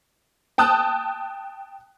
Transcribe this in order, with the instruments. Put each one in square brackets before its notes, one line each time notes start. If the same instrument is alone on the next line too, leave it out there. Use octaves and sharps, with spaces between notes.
[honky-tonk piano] G5 A5 D#6 F#6